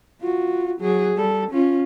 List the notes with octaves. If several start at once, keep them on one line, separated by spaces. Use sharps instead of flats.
F4 F#4
F#3 G#4
G3 A4
C#4 F4